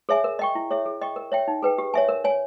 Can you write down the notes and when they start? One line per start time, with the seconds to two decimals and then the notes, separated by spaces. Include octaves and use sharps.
0.09 G#4 C#5 E5 G#5
0.24 A#4
0.39 D#5 G5 C#6
0.55 E4
0.71 G#4 C#5 E5
0.86 G#4
1.01 D#5 G5 C#6
1.16 A#4
1.32 C#5 E5 G5
1.48 D#4
1.63 G#4 B4 G5
1.78 G4
1.94 C#5 E5 G#5
2.09 A#4
2.24 C#5 G#5